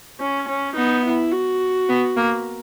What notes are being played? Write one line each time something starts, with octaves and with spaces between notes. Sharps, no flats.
C#4
C#4
B3 D#4
E4
F#4
B3
A#3